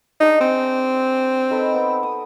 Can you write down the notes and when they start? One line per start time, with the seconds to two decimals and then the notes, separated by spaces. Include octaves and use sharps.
0.20 D4 D#4 G#4 D#5
0.41 C4
1.50 D#4 A4 B4
1.74 B3
2.03 D#6